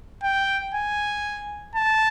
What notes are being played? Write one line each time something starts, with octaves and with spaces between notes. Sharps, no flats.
G5
G#5
A5